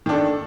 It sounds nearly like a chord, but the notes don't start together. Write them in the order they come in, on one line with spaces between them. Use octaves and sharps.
D#3 D4 A4